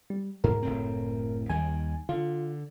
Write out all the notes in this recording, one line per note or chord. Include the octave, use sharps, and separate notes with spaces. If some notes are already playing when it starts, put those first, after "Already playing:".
G3
G#2 A#4
F#1 A2 C4
D#2 D#3 G3 G#5
D3 F4